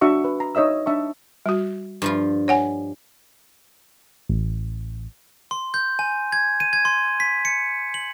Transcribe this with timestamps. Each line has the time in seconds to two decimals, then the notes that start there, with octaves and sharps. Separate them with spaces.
0.01 D4 F#4 E5 C#6
0.24 B4
0.40 A#5
0.55 D#4 C#5 D#5 E5 E6
0.86 D4 E5 A5 C#6
1.46 G3 F#4
2.02 G2 F3 F4
2.48 C#5 F#5 G#5
4.29 A1
5.51 C6
5.74 G6
5.99 G#5
6.32 G#6
6.60 D#7
6.73 G#6
6.85 C6
7.20 B6
7.45 C#7
7.94 F#7